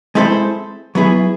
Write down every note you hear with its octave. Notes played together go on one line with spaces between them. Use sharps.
G#3 C4 E4 A4 C5
F#3 B3 E4 G#4